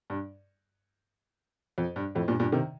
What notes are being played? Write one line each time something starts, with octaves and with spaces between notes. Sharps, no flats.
G2
F2
G2
F2 A2
G2 A#2
G2 A#2
C3 D#3